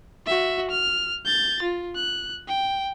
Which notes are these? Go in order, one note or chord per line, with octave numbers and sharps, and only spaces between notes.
F#4 E5
F6
G6 A6
F4
F#6
G5